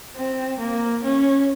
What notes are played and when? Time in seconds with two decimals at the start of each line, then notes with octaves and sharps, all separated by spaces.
0.17 C4
0.60 A#3
1.04 C#4